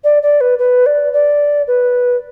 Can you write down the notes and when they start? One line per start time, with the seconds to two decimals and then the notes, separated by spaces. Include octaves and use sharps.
0.04 D5
0.22 D5
0.41 B4
0.58 B4
0.86 D5
1.13 D5
1.67 B4